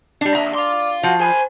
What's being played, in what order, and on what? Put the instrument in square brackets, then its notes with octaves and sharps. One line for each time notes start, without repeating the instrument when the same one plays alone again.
[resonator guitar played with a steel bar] G3 D4
[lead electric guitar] D#2 E5 [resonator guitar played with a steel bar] A#5
[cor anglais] D5 [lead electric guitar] F5 C6
[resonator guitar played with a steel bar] F3 [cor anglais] F#4
[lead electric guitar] C5 B5 [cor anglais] G#5